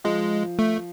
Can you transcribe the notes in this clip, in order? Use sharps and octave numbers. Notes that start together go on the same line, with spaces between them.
F3 G#3
A3